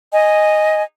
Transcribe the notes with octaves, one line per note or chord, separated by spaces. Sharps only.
D#5 G#5